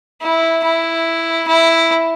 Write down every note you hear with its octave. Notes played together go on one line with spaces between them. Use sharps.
E4
E4
E4